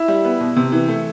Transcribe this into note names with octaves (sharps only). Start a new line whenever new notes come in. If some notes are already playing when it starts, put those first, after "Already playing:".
Already playing: E4
G3
B3
B2
C3
E3
A3